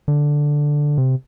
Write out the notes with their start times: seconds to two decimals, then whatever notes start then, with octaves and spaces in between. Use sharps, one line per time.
0.08 D3
0.98 C3